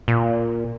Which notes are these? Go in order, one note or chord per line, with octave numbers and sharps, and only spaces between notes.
A#2